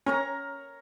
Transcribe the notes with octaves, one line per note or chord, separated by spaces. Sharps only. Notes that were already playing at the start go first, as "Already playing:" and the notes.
C#4 A#4 C#5 A#5